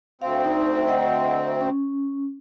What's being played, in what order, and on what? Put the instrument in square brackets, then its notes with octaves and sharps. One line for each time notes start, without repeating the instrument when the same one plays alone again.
[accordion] D2 C4 [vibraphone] F5
[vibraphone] D#4
D#5 F#5
C#4